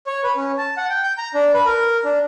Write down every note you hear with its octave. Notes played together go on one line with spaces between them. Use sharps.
C#5
B4
C#4
A5
F#5
G5
G6
A#5
D4
B4
A#4
D4